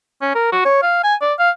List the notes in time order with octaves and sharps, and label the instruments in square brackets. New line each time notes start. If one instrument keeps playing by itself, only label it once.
[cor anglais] C#4
A#4
F#4
C#5
F5
G#5
D5
F5